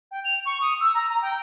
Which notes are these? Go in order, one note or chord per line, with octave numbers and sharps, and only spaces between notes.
G5
F7
C#6
D#6
E6
A#5
A#5
G5